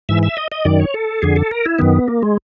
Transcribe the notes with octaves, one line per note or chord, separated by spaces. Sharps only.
G#2 E3 E5
E5
D#5
D#5
F#2 D#3 D5
C#5
A4
F2 D3 G#4
A4
A#4
E4
F#2 D#3 B3
A#3
G#3